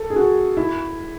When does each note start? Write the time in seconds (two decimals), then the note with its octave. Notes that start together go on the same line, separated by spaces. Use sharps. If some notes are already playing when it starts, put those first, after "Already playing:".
Already playing: A4
0.10 G#4
0.16 F#4
0.57 E4